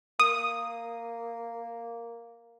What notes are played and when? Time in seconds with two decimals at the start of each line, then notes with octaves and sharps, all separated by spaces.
0.20 A#3 D#6